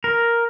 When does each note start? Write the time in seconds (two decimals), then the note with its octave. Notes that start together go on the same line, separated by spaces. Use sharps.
0.04 A#4